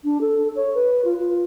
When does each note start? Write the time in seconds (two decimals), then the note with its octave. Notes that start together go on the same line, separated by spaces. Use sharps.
0.04 D4
0.21 A4
0.55 C#5
0.74 B4
1.05 F4
1.19 F4